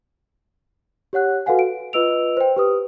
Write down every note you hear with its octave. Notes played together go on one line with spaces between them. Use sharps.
G4 C#5 F#5 F#6
F#4 A4 B4 F5 F#5 G#5
D7
F4 B4 D#5 E6 D7 F7
C5 G5
G4 B4 D#6